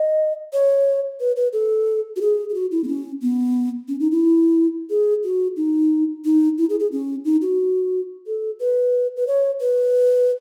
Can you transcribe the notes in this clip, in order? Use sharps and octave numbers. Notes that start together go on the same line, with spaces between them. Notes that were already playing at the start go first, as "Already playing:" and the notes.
Already playing: D#5
C#5
B4
B4
A4
F#4
G#4
G#4
F#4
E4
B3
C#4
B3
C#4
D#4
E4
G#4
F#4
D#4
D#4
E4
G#4
G#4
C#4
D#4
F#4
A4
B4
B4
C#5
B4